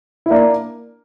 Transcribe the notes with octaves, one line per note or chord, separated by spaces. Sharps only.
E4
A#3 D4